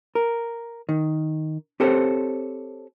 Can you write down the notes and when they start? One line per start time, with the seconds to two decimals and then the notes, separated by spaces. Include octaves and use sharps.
0.15 A#4
0.89 D#3
1.80 C4 G4 A4 C5 C#5